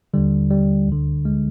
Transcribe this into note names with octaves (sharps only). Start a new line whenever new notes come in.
D#2 D3 G3
G3
D2 D3
G#3